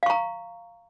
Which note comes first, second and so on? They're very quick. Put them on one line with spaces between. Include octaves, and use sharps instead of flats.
F5 C#6 A#5